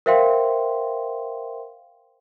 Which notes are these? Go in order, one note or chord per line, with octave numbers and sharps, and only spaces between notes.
A#4 C5 E5 F5 G5 C6